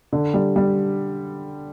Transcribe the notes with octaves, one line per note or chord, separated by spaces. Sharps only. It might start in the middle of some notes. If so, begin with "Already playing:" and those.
D3
G3
G3